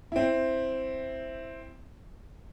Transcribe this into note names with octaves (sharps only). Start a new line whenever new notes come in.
C4 E4